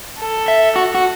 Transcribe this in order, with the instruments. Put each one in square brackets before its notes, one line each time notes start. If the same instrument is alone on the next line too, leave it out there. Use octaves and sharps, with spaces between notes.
[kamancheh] A4
[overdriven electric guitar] E5
F#4
F#4